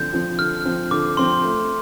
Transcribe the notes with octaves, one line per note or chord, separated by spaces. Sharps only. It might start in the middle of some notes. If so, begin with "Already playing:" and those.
Already playing: D3 F3 C4 G6
F3 C4
D3 F6
F3 C4
D3 D6
F3 C4 C6
A3